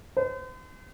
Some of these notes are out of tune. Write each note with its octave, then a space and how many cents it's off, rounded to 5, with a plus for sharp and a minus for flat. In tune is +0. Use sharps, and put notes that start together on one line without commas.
C5 -45